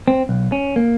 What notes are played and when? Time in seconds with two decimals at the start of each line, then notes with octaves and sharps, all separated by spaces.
0.08 C4
0.29 B1
0.52 C#4
0.76 A#3